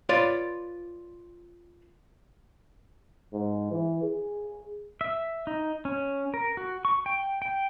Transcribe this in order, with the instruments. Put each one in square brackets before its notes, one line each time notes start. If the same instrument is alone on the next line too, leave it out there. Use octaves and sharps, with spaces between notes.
[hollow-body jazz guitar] F4 B4 C#5 D5
[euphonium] G#2
E3
G#4
[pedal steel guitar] E5
D#4
C#4
A#4
F#4
C#6
G5
G5